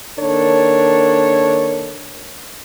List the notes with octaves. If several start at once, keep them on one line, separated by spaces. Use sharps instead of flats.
D#3 A#3 D4 A4 A#4 C#5